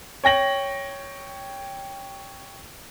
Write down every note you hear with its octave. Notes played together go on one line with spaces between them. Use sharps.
C#5 G5 A#6 F#7